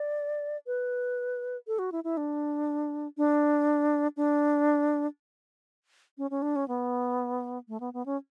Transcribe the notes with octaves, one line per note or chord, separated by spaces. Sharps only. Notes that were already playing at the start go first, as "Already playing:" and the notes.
Already playing: D5
B4
A4
F#4
E4
E4
D4
D4
D4
C#4
C#4
D4
C#4
B3
A3
B3
B3
C#4